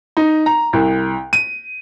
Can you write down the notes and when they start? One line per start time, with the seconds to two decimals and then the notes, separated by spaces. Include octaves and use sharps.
0.17 D#4
0.46 A#5
0.73 C2
1.33 D#7